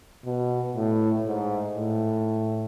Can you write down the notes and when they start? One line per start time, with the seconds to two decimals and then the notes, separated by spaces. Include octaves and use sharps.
0.25 B2
0.75 A2
1.26 G#2
1.75 A2